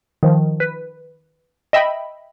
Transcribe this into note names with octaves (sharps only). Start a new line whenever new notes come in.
D#3 F3
B4
D#5 E5 G5 B5